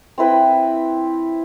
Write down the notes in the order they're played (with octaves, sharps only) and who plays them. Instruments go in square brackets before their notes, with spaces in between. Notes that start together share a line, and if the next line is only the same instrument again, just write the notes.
[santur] C4 E4 B4 G5